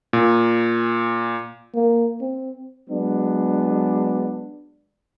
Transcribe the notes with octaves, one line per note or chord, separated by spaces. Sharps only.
A#2
A#3
C4
F#3 G#3 B3 D4